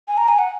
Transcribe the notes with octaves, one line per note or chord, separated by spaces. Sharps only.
G#5
A#5
G#5
F#5